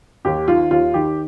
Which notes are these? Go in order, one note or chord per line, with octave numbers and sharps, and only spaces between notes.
D#2 G4
D#3 F4
D#2 F4
D#3 G4